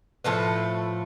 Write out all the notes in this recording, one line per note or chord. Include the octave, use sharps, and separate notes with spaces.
A2 F3 A3 B4